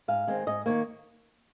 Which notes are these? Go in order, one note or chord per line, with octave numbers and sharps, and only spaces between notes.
G#2 F5
D#3 G#3 C4
G#2 D#5
D#3 F#3 A#3 C#5